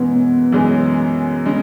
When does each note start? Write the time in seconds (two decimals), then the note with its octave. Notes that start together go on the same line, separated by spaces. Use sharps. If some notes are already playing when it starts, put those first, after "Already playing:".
Already playing: F#2 E3 G#3 B3 C#4
0.52 F#2 E3 G#3 C#4 G#4
1.45 C#3 G#3 C#4